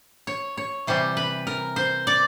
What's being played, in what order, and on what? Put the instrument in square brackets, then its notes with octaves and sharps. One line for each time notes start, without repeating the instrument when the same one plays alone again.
[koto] C#5
C#5
C3 E3 G3 C5
B4
A#4
C5
D5